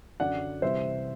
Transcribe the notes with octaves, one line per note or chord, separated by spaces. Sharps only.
F#2 D3 F#3 D5 F#5
C3 E3 G3 C5 E5